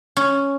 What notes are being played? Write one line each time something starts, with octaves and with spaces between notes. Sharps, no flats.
C#4